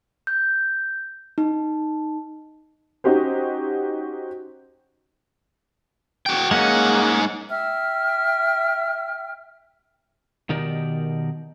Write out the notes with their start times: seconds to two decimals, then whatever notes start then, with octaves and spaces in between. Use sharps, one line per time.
0.27 G6
1.38 D#4
3.04 C#4 D#4 F#4 G4 C5
6.26 F#4 G5
6.51 G#2 G#3 A#3 C#4 F#5
7.50 E5 G5 F6
10.49 B2 D#3 D#4 G4 A#4 D5